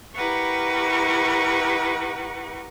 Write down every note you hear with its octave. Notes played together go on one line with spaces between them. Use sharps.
E4 G4 A#4 B4 F#5 C#6